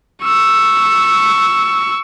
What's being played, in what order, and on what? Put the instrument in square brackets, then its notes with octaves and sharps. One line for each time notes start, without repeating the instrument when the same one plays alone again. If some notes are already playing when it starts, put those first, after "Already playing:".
[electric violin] C#6 E6